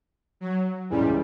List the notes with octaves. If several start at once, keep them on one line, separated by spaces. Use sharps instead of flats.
F#3
C#2 C#3 E3 G3